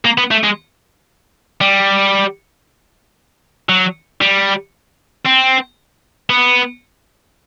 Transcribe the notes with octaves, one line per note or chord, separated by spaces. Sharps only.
A#3
B3
A3
G#3
G3
F#3
G3
C4
B3